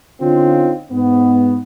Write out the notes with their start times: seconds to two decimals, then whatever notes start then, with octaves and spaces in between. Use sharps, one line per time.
0.21 D3 C4 C#4 D#4 F4
0.92 G#2 B3